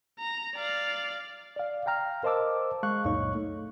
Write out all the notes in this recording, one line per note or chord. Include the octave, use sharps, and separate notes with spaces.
A#5
D5 F5
D5 F5
F5 G5 A#5 F6
A#4 C5 D#5 A5 D6 E6
G#3 F5 C#6 F#6
C#2 F#2 A#2 D#4 C#5 C#6
A3